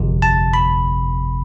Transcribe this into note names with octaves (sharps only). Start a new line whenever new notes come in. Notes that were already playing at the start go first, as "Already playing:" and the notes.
Already playing: G1 F2 C3
A5
B5